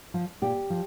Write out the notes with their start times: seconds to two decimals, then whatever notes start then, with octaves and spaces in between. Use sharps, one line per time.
0.14 F3
0.42 A#2 G4
0.70 F3